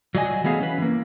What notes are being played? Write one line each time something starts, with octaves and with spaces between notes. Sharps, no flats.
F#3 F#4 D5 D#5 G#5
E3 F#3 A3 B3 G#4 F5
C#4 B4
E3 A#3